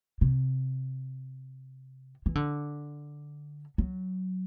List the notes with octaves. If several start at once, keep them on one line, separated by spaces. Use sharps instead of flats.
C3
E3
D3
F#3